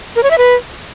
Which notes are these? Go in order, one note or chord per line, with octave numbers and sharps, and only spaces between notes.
A#4
C#5
E5
B4